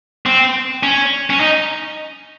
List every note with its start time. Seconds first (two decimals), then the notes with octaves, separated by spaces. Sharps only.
0.26 C4
0.83 C#4
1.30 C#4
1.40 D#4